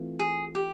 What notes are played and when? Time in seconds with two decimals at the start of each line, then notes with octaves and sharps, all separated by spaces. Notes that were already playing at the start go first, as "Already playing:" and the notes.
Already playing: E3 A3 C4 F4
0.19 G#4
0.55 G4